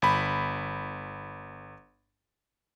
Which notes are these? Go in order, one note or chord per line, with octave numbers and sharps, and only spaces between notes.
G1 B5